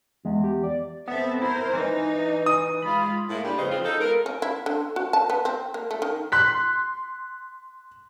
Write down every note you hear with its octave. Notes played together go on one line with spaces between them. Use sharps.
E2 G#3
G4
D5
B3 C4 A4 E5
E4 A#4 C5
E3 D#4
D#6
G#3 F4 B5
A2 G#3 A#3 E4
G3 A#3 D4
F2 G#2 C#3 B4 C5 D#5
C#3 E3 F3 C4 F4 G#4
D#4 A4
G#3 B3 F4 A#4
C#4
E4
D3
F#4
A5
B3
C4
A#3
A3
D#3
C6 F#6 B6